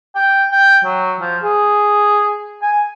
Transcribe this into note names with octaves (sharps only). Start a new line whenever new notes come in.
G5
G5
F#3
F3
G#4
G#5